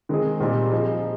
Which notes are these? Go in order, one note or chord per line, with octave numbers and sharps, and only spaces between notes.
D#3 G#3 C4 D#4 G#4
A#2 G3 C4 D#4
F3 C4 D#4 G#4